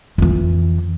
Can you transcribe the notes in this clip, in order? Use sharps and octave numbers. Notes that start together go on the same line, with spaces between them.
F2 E3